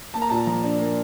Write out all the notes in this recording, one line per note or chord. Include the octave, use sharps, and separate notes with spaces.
A#3 A5
A#5
A#2 A5
F3 A#5
D4
A#3